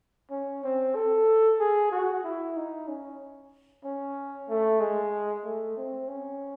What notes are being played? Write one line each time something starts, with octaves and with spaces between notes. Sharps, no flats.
C#4
C4
A4
G#4
F#4
E4
D#4
C#4
C#4
A3
G#3
A3
C4
C#4